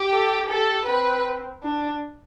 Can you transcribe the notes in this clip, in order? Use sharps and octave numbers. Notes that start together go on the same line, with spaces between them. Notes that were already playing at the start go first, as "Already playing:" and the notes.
Already playing: G4
A4
G4 A4
C4 B4
D4